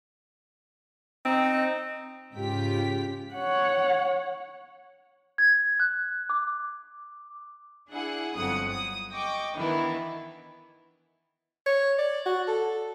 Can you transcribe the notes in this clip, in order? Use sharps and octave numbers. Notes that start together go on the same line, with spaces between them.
C4 D#4
G#2 C#3 F4 G4 G5 B6
C#5 F#5
G#6
F#6
D6
D4 E4 G#4 F#5
G1 F2 F#3 F#5 D#6
D#6
D#5 G5 C#6 D6
D#3 E3 B3 D4 E4
C#5
D5
F#4
A4